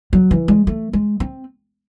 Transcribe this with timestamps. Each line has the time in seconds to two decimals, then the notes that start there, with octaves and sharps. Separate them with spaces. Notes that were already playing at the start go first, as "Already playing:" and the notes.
0.13 F#3
0.31 E3
0.48 G#3
0.67 A3
0.93 G#3
1.20 C4